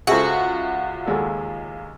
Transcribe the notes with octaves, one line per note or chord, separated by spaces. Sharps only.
C#2 F#4 G#4 A4 C5 E5
D#2 G#3 A4